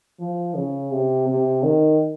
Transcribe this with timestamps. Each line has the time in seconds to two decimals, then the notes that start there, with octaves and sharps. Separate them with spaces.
0.20 F3
0.55 C#3
0.92 C3
1.28 C3
1.63 D#3